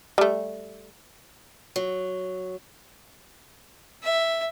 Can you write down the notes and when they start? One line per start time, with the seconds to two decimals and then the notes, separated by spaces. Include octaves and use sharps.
0.18 G3 A3
1.76 F#3
4.03 E5